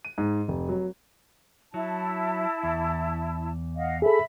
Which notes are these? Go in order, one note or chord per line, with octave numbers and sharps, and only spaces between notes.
D#7
G#2
F1
F#3
F#3 E4 A5
E2
D#5 F5 F#5
G#4 A4 E5 B5